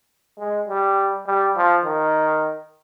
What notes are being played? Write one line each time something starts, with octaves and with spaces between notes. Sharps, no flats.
G#3
G3
G3
F3
D#3